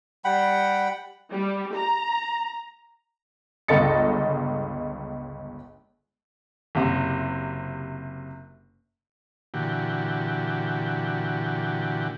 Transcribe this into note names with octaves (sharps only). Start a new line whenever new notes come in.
G3 F#5 G5 B5
G3
A#5
G1 C#2 A4 D#5 A6 C#7
F#1 C3
A#2 D3 E3 F#4 G4